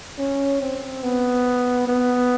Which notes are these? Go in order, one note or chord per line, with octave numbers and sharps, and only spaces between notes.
C#4
C4
B3
B3